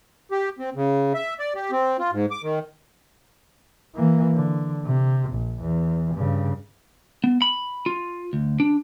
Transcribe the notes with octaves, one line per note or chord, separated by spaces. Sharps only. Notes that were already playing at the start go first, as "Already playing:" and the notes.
G4
C4
C#3
E5
D5
G4
C4
F4
G#2
D6
D#3
E3 A#3
D3
C3
A#1
E2
G2 C#3
B3
B5
F4
D2
D4